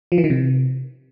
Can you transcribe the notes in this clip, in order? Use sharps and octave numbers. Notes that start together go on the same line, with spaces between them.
F3
E3
D#3
C3